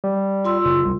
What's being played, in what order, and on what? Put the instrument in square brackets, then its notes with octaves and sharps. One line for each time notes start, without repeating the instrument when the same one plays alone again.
[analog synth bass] G3
[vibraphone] F4 C6 E6
[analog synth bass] F#1
C2